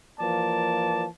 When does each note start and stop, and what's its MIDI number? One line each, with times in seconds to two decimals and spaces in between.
0.20 1.06 52
0.20 1.06 53
0.20 1.06 58
0.20 1.06 74
0.20 1.06 81